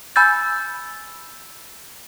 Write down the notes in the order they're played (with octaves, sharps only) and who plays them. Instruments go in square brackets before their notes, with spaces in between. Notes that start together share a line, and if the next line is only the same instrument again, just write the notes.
[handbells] G#5 B5 E6 G6 A6